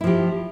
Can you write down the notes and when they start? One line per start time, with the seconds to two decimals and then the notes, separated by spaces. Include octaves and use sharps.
0.01 E4
0.04 F3
0.07 G4